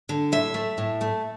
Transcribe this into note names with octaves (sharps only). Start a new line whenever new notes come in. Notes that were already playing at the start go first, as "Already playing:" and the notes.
D3
A2 E5
A3
A2
A3